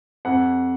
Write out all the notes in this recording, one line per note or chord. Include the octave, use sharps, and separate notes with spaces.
F2 F#5